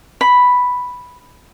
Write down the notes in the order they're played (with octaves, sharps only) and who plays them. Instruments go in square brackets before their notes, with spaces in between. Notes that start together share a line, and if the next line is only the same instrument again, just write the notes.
[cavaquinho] B5